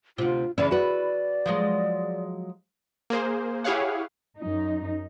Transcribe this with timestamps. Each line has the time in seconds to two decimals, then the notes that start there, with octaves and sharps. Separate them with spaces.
0.18 D2 C3 F4
0.58 C#3 E3 C#4 E4 D5
0.71 F#4 B4 D5
1.46 F3 F#3 G#3
3.10 A#3 G#4 C5
3.64 E4 G4 G#4 C#5 F5 F#5
4.38 F#2 D#4